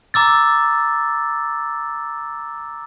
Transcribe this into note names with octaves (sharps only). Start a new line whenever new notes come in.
A#5 D6 E6 A6